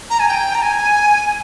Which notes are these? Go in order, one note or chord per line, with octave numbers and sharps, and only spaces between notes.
A#5
G#5
G5
A#5
G#5